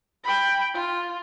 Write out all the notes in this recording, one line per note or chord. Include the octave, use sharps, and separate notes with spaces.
G5 B5
F4